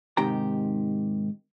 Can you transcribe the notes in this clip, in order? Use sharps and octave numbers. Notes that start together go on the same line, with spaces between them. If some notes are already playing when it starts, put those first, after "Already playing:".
G#2 C3 D#3 G4 A#5